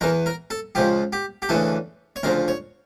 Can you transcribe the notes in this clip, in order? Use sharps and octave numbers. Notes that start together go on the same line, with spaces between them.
E2 E3 A#4
A#4
A4
C#2 C#3 F3 G4
G4
G4
D2 C#3 E3 A4
C#5
D2 C#3 F3 A#4
C#5